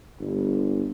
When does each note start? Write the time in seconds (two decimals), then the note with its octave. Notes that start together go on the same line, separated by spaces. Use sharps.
0.19 G1